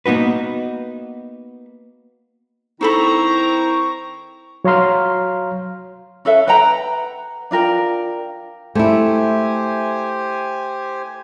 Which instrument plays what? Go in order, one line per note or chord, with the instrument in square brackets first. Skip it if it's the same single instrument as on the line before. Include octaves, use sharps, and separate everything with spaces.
[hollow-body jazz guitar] A#3 B3 D#4 F#4 B4
[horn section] D#3 C4 A#5 [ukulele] D#4 A4 B5 [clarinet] E4 [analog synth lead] C#6
[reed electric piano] F#3 C#5 F5 A#5 C6 F6
[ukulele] C#4 A4 B4 E5
B4 F#5 G5 A#5
D4 F4 A#4 G5
[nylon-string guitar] A3 E4 [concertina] G4 C5 G#5